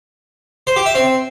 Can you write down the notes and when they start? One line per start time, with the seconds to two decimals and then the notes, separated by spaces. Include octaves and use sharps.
0.67 C5
0.76 G4
0.86 E5
0.95 C4